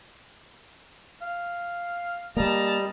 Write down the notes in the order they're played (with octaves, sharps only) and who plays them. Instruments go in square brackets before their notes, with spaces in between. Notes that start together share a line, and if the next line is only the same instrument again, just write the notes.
[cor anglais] F5
[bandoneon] G3 [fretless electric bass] A#3 [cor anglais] D#5 [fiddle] A5 A#5